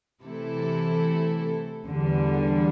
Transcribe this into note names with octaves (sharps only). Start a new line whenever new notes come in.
C3 E3 A3 E4 A4
E2 D3 G3